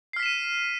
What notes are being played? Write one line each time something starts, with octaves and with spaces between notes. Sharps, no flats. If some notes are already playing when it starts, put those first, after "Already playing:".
F6 B6 C7 D#7 E7